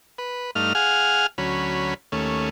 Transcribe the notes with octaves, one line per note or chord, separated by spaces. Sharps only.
B4
G2 A3 D#4 F5 F6
G#4 F5 F#5 G#5 F6
D2 F#3 C#4 B5
D#2 A3 C#4